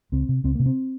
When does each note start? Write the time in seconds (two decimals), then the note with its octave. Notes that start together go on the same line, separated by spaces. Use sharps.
0.12 C#2 C4
0.29 C3
0.44 C#2 C4
0.55 C3 A#3
0.66 C4